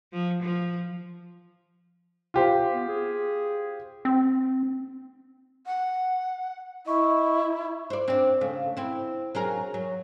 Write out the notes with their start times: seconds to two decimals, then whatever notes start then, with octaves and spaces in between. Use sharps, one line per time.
0.13 F3
0.42 F3
2.34 F4 G4 C5
2.73 B3
2.88 G#4
4.05 C4
5.66 F#5
6.86 E4 D#5 C#6
7.90 C5 D5
8.08 C4 D4
8.41 C#3 A3
8.77 C4 E4
9.35 F#3 G#4 A#4
9.74 F#3